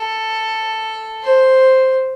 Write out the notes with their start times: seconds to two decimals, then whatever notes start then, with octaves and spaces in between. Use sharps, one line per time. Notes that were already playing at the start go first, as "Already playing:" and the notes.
Already playing: A4
1.23 C5